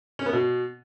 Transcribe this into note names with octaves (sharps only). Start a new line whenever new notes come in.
C#4
B3
B2